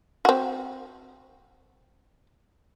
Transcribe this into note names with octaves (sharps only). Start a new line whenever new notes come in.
C4 F#4